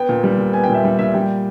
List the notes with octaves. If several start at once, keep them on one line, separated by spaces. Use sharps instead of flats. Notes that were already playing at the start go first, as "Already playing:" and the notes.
Already playing: B3 G5
A#2
G3
A#2
B3 G#5
G5
A#2
E5
G3
A#2 E5
G3 G5